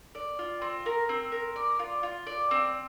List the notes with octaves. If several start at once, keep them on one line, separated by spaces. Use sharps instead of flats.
D5
F4
C4
A#4
C4
A#4
D5
F4
F4
D5
C4